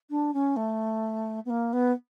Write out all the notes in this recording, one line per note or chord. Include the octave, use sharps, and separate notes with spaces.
D4
C#4
A3
B3
A#3
B3